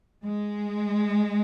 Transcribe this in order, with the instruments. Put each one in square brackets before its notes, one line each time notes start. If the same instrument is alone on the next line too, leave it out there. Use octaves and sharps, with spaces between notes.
[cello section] G#3